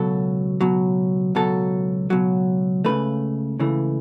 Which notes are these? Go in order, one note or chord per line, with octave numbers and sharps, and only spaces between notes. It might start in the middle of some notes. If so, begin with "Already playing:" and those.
Already playing: C#2 B2 F#3 A4
C#2 B2 F#3
C#2 B2 F#3 A4
C#2 B2 F#3
C#2 C#3 E3 A3 B4
C#2 C#3 E3 A3